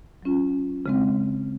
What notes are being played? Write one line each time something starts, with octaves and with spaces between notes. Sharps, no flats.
F#3 C#4 F4
C#3 G#3 C4